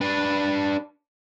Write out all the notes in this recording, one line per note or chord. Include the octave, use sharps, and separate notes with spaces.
D4 B4